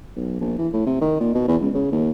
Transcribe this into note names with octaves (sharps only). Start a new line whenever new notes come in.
B1
A#1
E3
A2
C3
D#3
A#2
B2
E2
C#2
C#3
D#2